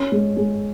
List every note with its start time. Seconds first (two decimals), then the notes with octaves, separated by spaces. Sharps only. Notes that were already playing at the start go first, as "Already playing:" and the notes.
Already playing: C#4
0.12 G#3
0.37 G#3